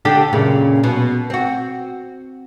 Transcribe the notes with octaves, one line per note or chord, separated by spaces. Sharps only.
D3 D4 G4
F#2 A#2 C#3
B2
C4 F#4